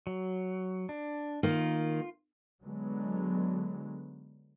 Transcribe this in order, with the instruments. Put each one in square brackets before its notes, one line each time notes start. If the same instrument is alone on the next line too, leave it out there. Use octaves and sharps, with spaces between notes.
[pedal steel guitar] F#3
D4
[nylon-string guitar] D#3 A#3 [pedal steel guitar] F4
[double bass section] D3 F#3 G#3 B3